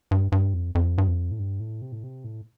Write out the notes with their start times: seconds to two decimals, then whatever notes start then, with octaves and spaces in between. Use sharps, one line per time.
0.11 G2
0.32 G2
0.54 F2
0.75 F2
0.98 G2
1.07 F2
1.31 A2
1.39 G2
1.60 A2
1.82 C3
1.92 A2
2.04 C3
2.24 A2